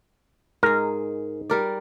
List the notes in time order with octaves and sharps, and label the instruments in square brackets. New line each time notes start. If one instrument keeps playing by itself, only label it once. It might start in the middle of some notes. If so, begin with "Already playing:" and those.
[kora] G#2 G#4 [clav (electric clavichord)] A#4
[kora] G3 A#4 D5